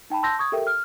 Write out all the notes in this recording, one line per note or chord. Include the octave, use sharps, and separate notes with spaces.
D#4 G5 A5 B5
A5 C6 E6 G6 A#6
C#6 D#6 G#6
G4 A4 A#4 E5 G5
F6